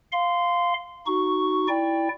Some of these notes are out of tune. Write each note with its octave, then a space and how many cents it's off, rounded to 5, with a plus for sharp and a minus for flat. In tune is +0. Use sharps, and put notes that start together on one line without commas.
F5 +0 C6 -15
D#4 +0 F#4 +10 C#6 +0
E4 +0 D5 -5 G5 +20